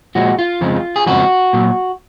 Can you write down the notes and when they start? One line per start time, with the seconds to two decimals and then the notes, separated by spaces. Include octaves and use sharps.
0.15 A#2 F3 G#3 F#4
0.39 F4
0.61 F2 C#3 F3 G#3
0.96 G#4
1.06 F2 C#3 F3 G#3 F#4
1.53 A#2 F#3